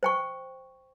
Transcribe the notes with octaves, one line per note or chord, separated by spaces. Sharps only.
C5 G5 C#6